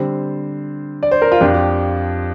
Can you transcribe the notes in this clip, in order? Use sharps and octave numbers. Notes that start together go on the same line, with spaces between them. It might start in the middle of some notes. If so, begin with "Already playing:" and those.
Already playing: D3 G3 C4 C5
D5
C5
A#4
F4
F2 F3 D4 G4
G4